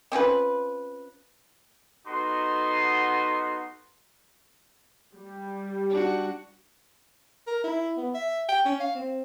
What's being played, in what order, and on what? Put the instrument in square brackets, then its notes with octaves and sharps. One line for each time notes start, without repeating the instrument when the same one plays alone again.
[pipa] C4 C#4 F4 B4
[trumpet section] B3 D#4 F#4 A4 D#5 C6
[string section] G3
[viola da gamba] D4 F#4
[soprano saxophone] A#4
E4
B3
E5
G5
C#4
F5
C4